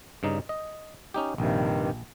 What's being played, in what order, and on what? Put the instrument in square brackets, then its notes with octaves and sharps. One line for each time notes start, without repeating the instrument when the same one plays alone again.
[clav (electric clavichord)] G2 C#3 D#4
D#5
C#4 D#4 G4
[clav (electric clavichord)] A#1 [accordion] G2 C3 D#3